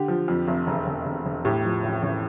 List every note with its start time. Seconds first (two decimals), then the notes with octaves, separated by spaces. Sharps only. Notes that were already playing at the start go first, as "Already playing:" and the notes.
Already playing: D3 G4
0.08 F3
0.28 F2
0.48 F1
0.67 E1
0.87 E1
1.06 E1
1.26 E1
1.45 A2 G4
1.64 F3
1.83 A1
2.03 A1